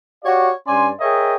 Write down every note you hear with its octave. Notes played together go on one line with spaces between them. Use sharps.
F#4 G4 C#5 D5 F5
G2 C#4 D5 G#5 C6
G#4 A#4 C#5 D#5 E5 G5